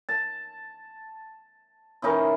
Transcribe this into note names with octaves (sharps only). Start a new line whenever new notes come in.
A5
E3 C#4 D#4 A#4